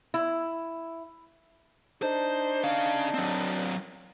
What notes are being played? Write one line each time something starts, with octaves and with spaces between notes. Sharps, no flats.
E4
D4 D#4 C5
C#4 F5
F#3 C4